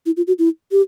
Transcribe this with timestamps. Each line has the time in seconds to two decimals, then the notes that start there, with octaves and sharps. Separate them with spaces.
0.06 E4
0.17 F4
0.27 F#4
0.39 E4
0.72 G4